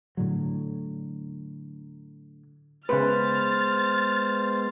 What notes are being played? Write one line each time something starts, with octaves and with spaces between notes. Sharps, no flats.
A2 D3 F#3
C#3 G#3 B3 B4 C5 F6 A6